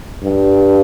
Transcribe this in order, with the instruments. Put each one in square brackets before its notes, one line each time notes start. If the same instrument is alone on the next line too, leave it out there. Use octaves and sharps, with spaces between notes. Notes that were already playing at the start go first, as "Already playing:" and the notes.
[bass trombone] G2